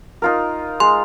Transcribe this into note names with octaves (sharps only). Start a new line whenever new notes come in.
D#4 F4 A#4
G#3 C6